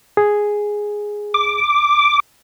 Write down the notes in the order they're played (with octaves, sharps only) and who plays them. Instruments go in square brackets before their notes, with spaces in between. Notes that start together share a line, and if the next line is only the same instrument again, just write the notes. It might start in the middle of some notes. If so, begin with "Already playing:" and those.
[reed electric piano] G#4
[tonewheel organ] D6